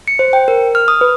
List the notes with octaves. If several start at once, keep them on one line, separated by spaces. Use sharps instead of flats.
C#7
C5
G5
A#4
F6
D#6
B4